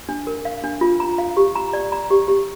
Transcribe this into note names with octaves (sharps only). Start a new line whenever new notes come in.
D4
A#4
F5
D4
F4
A#5
F5
G4
A#5
D5
A#5
G4
G4